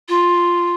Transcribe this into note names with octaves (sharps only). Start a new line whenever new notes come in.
F4